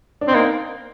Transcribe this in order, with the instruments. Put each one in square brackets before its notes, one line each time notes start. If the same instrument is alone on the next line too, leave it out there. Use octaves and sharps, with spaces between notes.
[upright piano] D4
[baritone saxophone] C4
[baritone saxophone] A#3 [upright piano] D#4